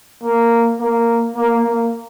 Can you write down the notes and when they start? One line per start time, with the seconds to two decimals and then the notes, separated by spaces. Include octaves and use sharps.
0.24 A#3
0.80 A#3
1.36 A#3
1.65 A#3